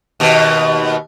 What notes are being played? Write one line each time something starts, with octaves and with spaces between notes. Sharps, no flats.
D#2 B2